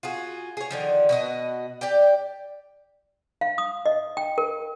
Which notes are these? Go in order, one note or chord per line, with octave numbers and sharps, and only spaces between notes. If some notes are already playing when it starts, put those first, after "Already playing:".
F4 F#4 G#4
G#4 C#5
D3 D#3 F3
B2 F#4 D#5
G4 D5 G5
F5
D#6
D#5
G5
A#4